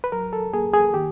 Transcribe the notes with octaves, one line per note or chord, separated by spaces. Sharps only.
B4
F#3 A#4
A4
A#3 G#4
G#4
D#3 G4